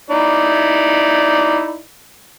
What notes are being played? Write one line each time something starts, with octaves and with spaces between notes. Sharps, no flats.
D#4 E4 D5